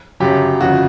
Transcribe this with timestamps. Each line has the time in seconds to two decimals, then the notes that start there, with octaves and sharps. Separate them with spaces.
0.20 G1 F#2 C#3 F#3 G4
0.61 G1 F2 C#3 F#4